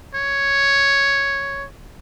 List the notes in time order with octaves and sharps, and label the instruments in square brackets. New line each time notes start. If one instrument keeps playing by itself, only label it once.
[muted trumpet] C#5